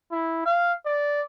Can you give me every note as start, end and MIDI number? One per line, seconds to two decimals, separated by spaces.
0.12 0.45 64
0.46 0.73 77
0.86 1.21 74